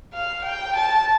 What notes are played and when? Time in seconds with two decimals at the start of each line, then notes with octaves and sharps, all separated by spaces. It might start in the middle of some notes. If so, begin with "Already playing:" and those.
0.14 F5
0.45 G5
0.76 A5